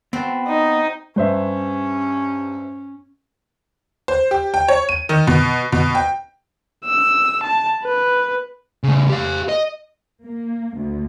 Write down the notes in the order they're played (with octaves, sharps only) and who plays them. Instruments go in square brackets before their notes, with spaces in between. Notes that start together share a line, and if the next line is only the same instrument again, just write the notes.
[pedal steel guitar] B3 A5 [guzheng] C4 F#4
[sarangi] D#4
[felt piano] G2 [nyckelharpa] C#4 [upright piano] B4 C5 E5
[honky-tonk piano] C5
G4
G5
C#5
D#7
D#3
B2
B2
G5
[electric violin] E6
A5
B4
[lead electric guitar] C#3 A3
G4 F5
D#5
[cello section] A#3
D2